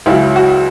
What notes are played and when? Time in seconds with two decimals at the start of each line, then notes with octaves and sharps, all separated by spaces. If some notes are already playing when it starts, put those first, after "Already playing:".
0.06 C#2 C#3 F#3 E4
0.36 F#4